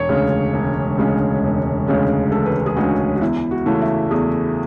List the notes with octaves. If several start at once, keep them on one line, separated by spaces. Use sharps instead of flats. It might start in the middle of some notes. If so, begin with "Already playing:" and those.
Already playing: E1 C#5
D2 C#3 G#3 C#4
E1
D2 C#3 G#3 C#4
E1
D2 C#3 G#3 C#4
E1 A4
B4
A4
G#4
D2 C#3 G#3 C#4 F#4
F#4
E2 E4
F#4
C#3 E3 A3
E5
E2 G#4